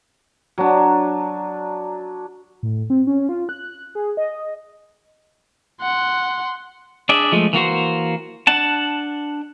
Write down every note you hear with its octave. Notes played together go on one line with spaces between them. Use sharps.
F#3 D4
A2
C4
C#4
F4
F#6
G#4
D#5
F#5 C6
D4 G#4 D5 E5
F3 G#3 A3
E3 A#3 F#4 C5
D4 F#5 A5